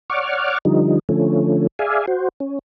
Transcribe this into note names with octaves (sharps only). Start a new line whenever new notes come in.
C#5 D5 F#5 C#6 D6 F6
D3 F3 G3 D#4
D3 F3 A3 C#4
G#4 D5 E5 F5 G#5
F#4 C5
C#4